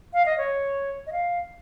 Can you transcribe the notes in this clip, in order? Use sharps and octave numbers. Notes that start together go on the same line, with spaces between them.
F5
D#5
C#5
D#5
F5